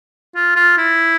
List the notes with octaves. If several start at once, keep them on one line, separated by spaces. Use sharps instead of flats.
F4
F4
E4